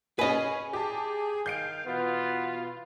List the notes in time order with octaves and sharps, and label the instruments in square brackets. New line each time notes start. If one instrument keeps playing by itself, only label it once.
[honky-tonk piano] C#4 G#4 [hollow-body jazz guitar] B4 D#5
[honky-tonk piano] G4 A5 [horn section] G#4
[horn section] D#3 F5 [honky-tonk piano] G6 C7 D7
[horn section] B2 E3 F4 [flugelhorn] B3